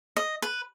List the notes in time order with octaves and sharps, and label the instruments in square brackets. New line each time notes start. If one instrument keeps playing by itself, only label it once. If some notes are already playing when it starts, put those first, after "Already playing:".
[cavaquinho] D#5
B4